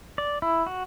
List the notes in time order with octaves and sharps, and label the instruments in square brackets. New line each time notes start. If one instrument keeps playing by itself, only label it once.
[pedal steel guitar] D5
E4
F#4